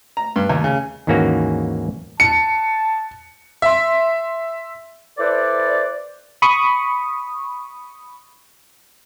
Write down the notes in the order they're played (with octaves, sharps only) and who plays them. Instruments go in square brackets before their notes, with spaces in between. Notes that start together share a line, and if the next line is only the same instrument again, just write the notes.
[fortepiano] A#5
G2
D#2
C#3
[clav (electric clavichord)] D#2 G#2 E3 A#3 C#4 F#4
[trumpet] A5 [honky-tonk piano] C#7
[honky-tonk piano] E5 C6
[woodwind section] E4 A4 B4 C5 D5
[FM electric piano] B5 C#6 D#6